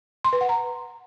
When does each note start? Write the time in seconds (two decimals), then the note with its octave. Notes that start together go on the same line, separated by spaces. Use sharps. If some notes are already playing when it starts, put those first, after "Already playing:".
0.24 C6
0.33 B4
0.41 F#5
0.49 A#5